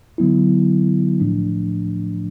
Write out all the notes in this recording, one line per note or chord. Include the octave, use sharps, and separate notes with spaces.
D3 F#3 B3 E4
A2 F3 A3 D4